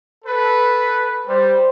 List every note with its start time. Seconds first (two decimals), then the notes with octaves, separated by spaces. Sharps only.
0.24 A4 B4
1.27 G3 C5